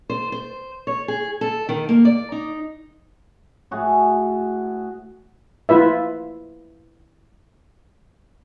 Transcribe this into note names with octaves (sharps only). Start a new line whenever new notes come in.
C5
C5
C#5
G#4
A4
D#3
A#3
D5
D#4
A2 F#4 G#4
E4 F4 B4 E5